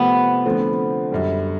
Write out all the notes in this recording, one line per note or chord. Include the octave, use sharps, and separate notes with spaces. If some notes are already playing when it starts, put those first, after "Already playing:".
Already playing: C3 F3 A3 B3 C4
D3 F3 A3 C4
F#2 D3 G3